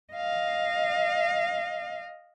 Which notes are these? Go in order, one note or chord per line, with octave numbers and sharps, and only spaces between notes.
D#5 F5